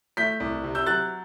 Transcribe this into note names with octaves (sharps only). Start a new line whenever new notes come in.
A3 G6 B6
C2
C3
E6 G6
F#3 F#6 A6